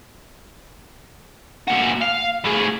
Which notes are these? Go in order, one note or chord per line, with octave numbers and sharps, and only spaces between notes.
A#2 F#4
F5
A2 G#4